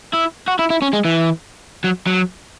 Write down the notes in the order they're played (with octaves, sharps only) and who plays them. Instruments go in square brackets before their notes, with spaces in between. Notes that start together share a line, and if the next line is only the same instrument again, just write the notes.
[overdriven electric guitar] E4
F#4
E4
E4
C#4
G#3
E3
F#3
F#3